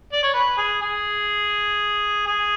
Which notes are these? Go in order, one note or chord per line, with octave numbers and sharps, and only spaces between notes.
D5
C#5
B4
G#4
G#4
G#4